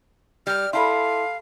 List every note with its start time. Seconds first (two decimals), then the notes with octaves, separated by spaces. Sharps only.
0.47 G3 F6
0.73 E4 A4 F5 A5 C6